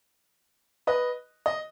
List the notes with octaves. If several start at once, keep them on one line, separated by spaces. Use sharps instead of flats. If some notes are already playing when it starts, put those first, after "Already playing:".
B4 D#5
D#5